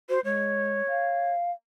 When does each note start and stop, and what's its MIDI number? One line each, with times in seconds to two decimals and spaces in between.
0.09 0.19 66
0.09 0.20 72
0.24 0.82 56
0.24 1.31 73
0.88 1.51 77